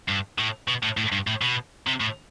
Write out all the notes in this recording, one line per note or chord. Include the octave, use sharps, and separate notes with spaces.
G2
A2
B2
A2
A2
G2
A2
B2
C3
A2